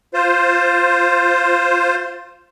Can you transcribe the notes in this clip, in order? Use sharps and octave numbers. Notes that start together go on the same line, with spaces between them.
F4 C5